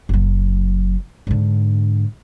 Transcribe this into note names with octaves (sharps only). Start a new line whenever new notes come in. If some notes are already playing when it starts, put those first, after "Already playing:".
F#1 F#3
G#2 D3